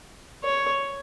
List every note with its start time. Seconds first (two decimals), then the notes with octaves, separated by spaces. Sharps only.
0.44 C#5